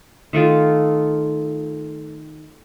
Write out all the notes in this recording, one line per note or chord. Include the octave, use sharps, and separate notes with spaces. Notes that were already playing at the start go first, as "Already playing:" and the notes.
D#3 A3 F4